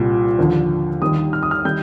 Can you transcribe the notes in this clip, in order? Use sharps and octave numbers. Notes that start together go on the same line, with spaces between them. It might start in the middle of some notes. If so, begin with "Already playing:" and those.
Already playing: C2 A#2 G3
D#2 D3 F3
D#2 D#3 G3 D#6
F6
D#6
F6
D#3 G3 G6